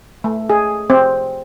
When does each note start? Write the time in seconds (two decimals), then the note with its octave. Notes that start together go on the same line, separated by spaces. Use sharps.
0.24 A3
0.50 G#4
0.90 C4